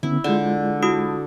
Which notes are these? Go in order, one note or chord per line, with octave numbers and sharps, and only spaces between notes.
D3 B3 C#4 E4
D3 G#3 F4 G#4 D5
E4 F#4 D#6